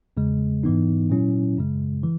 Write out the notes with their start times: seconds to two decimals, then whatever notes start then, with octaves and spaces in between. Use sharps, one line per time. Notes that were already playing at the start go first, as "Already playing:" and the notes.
0.17 E2 C#3 G#3
0.63 G#2 E3 B3 D#4
1.10 A#2 F#3 C#4 E4
1.57 F#2 C#3 G#3
2.03 E3